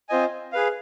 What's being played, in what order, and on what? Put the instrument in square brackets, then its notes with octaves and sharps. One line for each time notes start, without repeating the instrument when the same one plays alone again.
[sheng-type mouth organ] C4 F4 C5 D#5 G#5
G#4 B4 F5